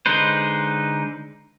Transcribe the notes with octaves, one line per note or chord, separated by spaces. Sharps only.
D3 G#3 D#4 B4 C5